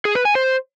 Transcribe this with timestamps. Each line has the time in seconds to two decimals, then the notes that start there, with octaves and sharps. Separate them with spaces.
0.05 G#4
0.15 B4
0.25 G#5
0.35 C5